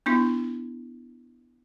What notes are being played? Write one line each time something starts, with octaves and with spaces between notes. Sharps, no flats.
B3 D4 E4